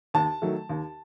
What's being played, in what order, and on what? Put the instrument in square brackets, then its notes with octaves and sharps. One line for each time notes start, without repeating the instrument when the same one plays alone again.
[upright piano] D#2 A5
D#3 F#3 A3
D#2